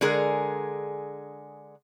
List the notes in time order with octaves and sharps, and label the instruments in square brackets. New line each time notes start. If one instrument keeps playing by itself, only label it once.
[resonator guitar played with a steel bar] D3 G#3 G#4 A#4